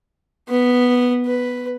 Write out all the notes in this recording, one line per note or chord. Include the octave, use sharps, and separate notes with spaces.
B3
B4